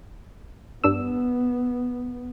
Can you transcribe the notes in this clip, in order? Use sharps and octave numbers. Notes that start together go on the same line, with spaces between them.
G2 B3 D4 E6